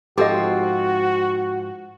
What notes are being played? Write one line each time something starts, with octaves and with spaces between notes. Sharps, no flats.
G#2 F3 C4 F#4 G4 A4 D#5